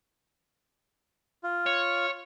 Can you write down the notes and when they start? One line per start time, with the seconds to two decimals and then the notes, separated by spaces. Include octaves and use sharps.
1.43 F4
1.66 C#5